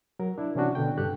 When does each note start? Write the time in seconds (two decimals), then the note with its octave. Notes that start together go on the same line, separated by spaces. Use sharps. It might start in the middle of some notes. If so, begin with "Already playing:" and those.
0.19 F#3 A#4
0.38 D4 E4
0.55 C3 E3 C#4 D4 F#4
0.75 B2 D3 G5
0.98 G2 G4 A4 F#6